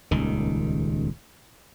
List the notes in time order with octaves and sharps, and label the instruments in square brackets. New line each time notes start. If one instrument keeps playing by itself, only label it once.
[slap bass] D#1 C#2 D#3